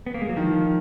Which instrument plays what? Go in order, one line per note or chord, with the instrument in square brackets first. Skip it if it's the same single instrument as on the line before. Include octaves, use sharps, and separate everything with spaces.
[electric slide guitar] B3
A#3
G#3
F#3
[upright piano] D#3 [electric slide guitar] F3